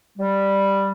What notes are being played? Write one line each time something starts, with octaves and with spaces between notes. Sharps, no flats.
G3